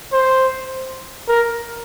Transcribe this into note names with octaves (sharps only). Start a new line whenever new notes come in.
C5
A#4